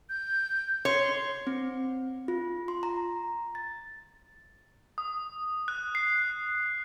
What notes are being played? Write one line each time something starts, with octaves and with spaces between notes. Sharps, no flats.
G6
C#5 C6
C4
F4
C6
A#5
A6
D#6
F#6
C7